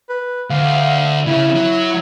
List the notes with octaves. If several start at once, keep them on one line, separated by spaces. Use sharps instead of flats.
B4
D2 F5
C#3 C#4 E4
F#3